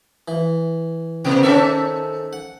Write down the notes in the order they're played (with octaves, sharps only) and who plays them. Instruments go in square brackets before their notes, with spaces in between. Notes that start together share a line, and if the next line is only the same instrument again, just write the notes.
[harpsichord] E3
[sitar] C3 [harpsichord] B3 C4
[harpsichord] D#3 C4 [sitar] C#4 A4 E5
[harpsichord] F#5